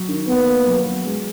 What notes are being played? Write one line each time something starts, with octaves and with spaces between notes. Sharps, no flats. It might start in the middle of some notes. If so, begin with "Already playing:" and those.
Already playing: F#3
D#3
A#3 B3
A#3
F#3
F#3
G#3